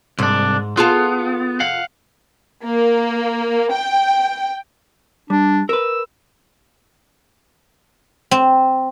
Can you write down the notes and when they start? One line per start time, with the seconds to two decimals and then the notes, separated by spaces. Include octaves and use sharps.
0.19 C2 G#2 D4
0.77 B3 F4 G#4 A4
1.60 F5 F#5
2.64 A#3
3.72 G5
5.30 G3 D4
5.69 A#4 B4 E6
8.31 C4